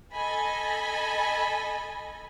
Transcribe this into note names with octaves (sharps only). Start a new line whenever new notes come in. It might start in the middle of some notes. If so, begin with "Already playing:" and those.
A4 D#5 G#5 B5